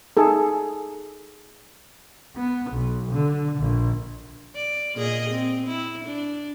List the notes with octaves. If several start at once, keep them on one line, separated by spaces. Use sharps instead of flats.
D#4 G#4 A4
B3
B1
D3
A#1
D5
A#2 G#4 D#5
C4
E4
D4